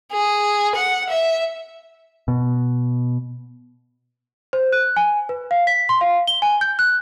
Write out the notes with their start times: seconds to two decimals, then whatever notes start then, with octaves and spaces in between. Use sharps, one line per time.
0.12 G#4
0.76 F#5
1.10 E5
2.28 B2
4.53 C5
4.72 F#6
4.96 G#5
5.29 B4
5.51 F5
5.67 B6
5.89 C6
6.01 F5
6.27 G7
6.42 G#5
6.61 G6
6.79 F#6